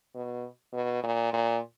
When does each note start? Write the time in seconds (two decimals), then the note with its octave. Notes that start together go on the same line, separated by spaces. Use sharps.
0.15 B2
0.73 B2
1.03 A#2
1.33 A#2